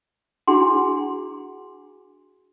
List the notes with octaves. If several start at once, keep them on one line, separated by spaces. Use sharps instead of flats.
D4 E4 F#4 G#4 F#5 C6